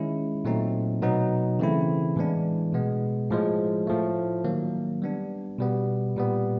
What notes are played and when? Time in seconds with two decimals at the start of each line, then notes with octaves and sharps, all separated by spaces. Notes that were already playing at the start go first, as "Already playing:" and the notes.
Already playing: D#3 G#3 C#4 E4
0.45 A#2 F#3 A3 C4 D#4
1.02 B2 F#3 B3 D#4
1.59 C#3 E3 A3 C4 E4
2.16 A2 E3 G#3 B3 D4
2.73 B2 G#3 B3
3.30 A2 F3 G#3
3.87 A2 F3 A3
4.44 D#3 F#3 A#3
5.02 G3 B3 D4
5.58 B2 G3 B3
6.16 A#2 G3 B3